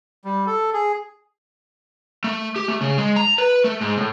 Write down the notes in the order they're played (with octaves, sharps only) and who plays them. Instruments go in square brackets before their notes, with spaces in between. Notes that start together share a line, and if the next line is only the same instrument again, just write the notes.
[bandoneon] G3
A4
G#4
[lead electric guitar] A3
G4
A3
C#3
G#3
A#5
B4
A3
G#2
A2